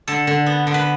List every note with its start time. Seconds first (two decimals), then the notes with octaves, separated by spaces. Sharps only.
0.08 D3 A4
0.27 D3
0.46 B3
0.67 D3
0.74 B4